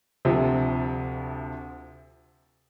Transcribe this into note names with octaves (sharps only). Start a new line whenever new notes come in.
D2 C3 F3